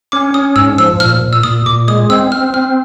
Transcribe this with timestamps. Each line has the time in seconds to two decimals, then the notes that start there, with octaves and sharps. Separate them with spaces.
0.12 C#4 D6
0.34 C#4 D#6
0.56 G#2 E6
0.78 F3 E6
1.00 A#2 F6
1.21 A#2
1.33 E6
1.43 A#2 D#6
1.66 A#2 D6
1.88 G#3 D#6
2.10 C4 E6
2.31 C4 F6
2.54 C4 F6